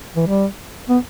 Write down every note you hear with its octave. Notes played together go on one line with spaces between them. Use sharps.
E3
G3
B3